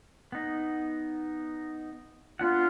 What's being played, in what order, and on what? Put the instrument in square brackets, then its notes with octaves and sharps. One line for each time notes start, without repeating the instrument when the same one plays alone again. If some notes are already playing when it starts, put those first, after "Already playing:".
[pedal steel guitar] B3 D#4
[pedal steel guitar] B3 D4 F#5 [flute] F4